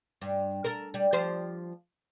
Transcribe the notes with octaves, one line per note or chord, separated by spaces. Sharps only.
G2
A4 A#4
G3
F3 G4 C5